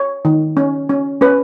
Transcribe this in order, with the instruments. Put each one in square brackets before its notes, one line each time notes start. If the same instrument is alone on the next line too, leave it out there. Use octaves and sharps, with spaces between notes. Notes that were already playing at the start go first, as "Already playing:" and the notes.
Already playing: [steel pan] C#5
D#3
C#4
C#4
C#4 B4